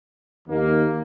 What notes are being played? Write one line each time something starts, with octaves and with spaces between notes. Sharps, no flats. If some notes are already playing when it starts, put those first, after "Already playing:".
D#2 D#3 A#3